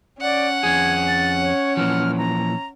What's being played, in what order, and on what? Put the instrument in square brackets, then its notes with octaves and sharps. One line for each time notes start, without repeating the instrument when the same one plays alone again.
[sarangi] C#4 [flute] D5 [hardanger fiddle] F#5
[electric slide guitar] F2 G#4 [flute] G#6
[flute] A6
C#5
[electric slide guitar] A#2 E3 F3 [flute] F6
[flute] A#5